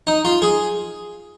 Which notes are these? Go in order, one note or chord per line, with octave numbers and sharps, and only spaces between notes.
D#4
F4
G#4